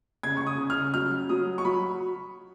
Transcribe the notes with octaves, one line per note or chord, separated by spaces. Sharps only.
C#3 G#6
C#6
D#6
C#3
F6
F#3 F6
F#3 D#6
C#6
F#3 B5